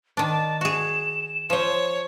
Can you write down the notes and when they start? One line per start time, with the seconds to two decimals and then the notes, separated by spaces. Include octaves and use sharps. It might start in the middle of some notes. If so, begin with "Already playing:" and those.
0.17 D#3 D4 A5
0.61 F#4 G#4 E7
1.50 F3 C5 C#5